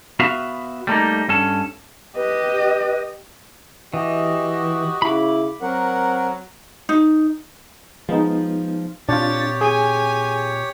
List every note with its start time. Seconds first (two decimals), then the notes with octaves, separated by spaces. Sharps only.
0.20 B3 F#4 E5 F5
0.87 G3 A3 A#3 D#4
1.28 G2 C#4 A4
2.16 G4 B4 D#5
3.94 E3 F#4 G4 D#5
5.02 C#3 E4 B5 D6
5.62 F#3 C4 A#4 F#5
6.89 D#4
8.09 F3 G#3 B3 D#4
9.09 A#2 C4 D4 F4 G4 C#5 A6
9.61 G#4 G#5